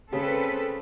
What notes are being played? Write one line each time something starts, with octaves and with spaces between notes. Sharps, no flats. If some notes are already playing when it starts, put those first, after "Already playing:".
C#3 C4 A4 B4